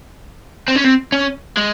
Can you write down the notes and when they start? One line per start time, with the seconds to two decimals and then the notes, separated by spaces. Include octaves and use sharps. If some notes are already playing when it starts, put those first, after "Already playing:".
0.68 C4
0.76 C#4
0.84 C4
1.12 C#4
1.57 G#3